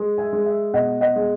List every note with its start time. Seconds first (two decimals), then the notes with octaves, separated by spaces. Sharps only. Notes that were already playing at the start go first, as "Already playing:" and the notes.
Already playing: G#3
0.18 E5 G#5
0.33 G#3
0.46 E5
0.74 B2 D#5 F#5
1.01 D#5 F#5
1.16 G#3